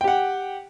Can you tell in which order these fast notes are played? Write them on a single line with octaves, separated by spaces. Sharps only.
G5 G4 F#5